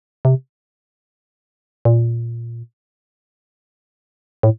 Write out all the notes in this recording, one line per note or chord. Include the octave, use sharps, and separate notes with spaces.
C3
A#2
A2